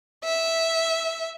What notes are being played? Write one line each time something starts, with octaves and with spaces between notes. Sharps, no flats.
E5